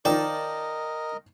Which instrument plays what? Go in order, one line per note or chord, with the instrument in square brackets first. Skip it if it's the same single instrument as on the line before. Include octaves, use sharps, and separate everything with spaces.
[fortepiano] D#3 F3 D#4 [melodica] A#4 D#5 [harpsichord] D5 G5 A5